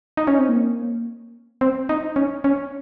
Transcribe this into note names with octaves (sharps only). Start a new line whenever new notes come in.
D#4
C#4
C4
A#3
C4
D#4
C#4
C#4